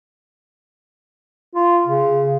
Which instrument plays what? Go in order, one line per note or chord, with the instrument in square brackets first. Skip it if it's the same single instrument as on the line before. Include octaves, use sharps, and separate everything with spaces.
[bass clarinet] F4
C#3